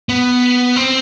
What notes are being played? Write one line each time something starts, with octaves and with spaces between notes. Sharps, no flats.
B3
C4